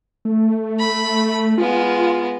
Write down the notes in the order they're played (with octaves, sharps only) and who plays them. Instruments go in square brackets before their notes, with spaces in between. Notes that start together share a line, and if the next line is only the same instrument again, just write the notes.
[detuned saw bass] A3
[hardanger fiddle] B5
[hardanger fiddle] G#3 B3 [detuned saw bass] F4